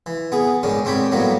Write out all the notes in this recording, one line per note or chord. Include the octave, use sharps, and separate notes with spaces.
E3
B3 G#4
G#2 D#3 C#4 D4
G#2 C4 G4 C#5 B5
A2 F#3 G3 A#3 B3